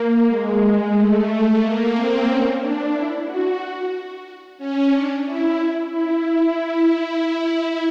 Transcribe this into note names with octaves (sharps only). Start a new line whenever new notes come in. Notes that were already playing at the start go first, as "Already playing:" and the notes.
Already playing: A#3
G#3
A3
A#3
C4
C#4
D4
E4
F#4
C#4
D4
E4
E4